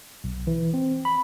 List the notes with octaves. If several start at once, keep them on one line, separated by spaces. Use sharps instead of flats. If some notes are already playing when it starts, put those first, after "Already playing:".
B1
E3
C4
B5